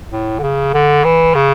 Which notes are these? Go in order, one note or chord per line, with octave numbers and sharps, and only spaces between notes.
A2
D3
C#3
D3
E3
C#3